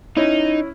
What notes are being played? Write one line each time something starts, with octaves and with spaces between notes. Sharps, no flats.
C#4 D#4 E4